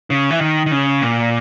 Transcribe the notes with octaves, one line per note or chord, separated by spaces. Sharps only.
C#3
E3
D#3
D#3
C#3
A#2